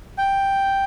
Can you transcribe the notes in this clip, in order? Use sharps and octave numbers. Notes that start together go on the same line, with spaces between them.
G5